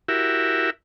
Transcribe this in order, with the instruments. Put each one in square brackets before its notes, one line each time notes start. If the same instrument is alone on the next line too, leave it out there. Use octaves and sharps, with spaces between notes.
[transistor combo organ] E4 F#4 G4 A#4 E5